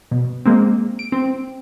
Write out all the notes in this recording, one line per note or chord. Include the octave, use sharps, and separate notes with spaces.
B2
G#3 A#3 C4
D7
C4